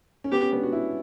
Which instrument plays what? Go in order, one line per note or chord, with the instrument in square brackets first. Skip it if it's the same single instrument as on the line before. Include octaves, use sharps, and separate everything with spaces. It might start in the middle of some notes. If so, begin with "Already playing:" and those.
[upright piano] C#4
[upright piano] B3 [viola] G4
[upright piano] C#4
B3 D4
F#4
C#4 E4